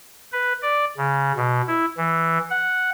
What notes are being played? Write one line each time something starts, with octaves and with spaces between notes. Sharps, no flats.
B4
D5
C#3
B2
E4
E3
F#5